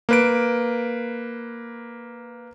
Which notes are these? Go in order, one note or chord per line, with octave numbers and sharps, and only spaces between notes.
A#3 B4 D7